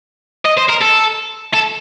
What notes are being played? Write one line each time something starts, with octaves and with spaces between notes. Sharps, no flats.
D#5
C5
A#4
A4
A4